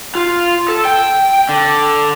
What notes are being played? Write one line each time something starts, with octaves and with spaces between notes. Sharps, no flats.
F4
A4
G5
D3